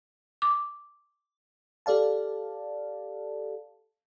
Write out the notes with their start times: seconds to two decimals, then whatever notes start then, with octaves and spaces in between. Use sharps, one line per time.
0.42 D6
1.86 G4 A4 D5 F5 A5